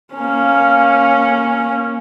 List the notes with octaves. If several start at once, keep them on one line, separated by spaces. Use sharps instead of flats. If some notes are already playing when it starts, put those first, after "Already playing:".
A#3 C#4